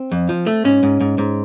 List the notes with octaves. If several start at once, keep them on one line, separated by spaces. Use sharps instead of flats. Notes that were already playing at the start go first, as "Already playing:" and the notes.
Already playing: C4
F2
F3
A3
G#2 C#4
G#2
G#2
G#2